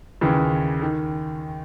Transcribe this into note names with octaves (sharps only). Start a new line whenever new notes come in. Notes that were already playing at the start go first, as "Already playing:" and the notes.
D#2 C#3 E3
D#3